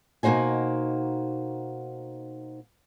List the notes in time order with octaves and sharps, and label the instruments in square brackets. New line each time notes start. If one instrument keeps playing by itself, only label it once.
[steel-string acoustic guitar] B2 A#3 D#4 F#4 C5 G#5